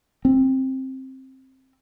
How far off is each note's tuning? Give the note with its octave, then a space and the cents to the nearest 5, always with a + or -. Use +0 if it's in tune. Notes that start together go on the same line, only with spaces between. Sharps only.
C4 +15